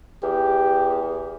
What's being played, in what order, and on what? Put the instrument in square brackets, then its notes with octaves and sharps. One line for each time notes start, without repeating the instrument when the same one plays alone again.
[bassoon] E2 [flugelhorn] G4